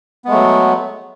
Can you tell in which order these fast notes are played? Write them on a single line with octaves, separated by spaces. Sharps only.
B3 G#3 A3 F#3